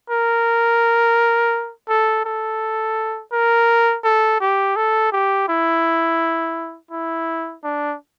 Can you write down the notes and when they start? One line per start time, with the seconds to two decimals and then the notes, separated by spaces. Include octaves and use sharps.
0.10 A#4
1.89 A4
2.25 A4
3.32 A#4
4.04 A4
4.41 G4
4.76 A4
5.12 G4
5.48 E4
6.91 E4
7.64 D4